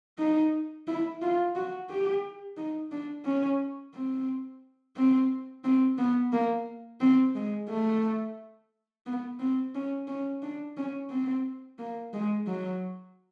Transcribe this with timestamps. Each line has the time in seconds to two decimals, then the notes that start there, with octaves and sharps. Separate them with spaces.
0.18 D#4
0.88 E4
1.22 F4
1.55 F#4
1.90 G4
2.57 D#4
2.92 D4
3.25 C#4
3.94 C4
4.96 C4
5.64 C4
5.98 B3
6.33 A#3
7.00 C4
7.35 G#3
7.69 A3
9.06 B3
9.39 C4
9.75 C#4
10.08 C#4
10.42 D4
10.77 C#4
11.10 C4
11.79 A#3
12.13 G#3
12.47 F#3